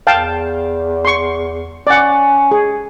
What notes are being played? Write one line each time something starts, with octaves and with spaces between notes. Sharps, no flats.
E2 F5 G5 A5
C6 C#6
C#4 D5 F#5
G#4